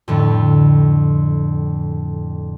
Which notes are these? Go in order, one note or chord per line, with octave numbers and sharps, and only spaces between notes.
F2 A2 D3